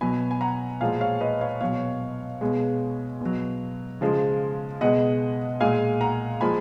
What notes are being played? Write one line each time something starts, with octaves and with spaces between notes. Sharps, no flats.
B2 F#3 G#5 B5
G#5
F#5 A#5
A#2 F3 G#3 F5 G#5
C#5 F5
B4 D#5
C#5 F5
B2 F#3 C#5 F5
B2 G#3
B2 F#3
C#3 F3 G#3
B2 G#3 D#5 F#5
A#2 G#3 F5 G#5
F#5 A#5
A#2 F3 G#3 G#5 B5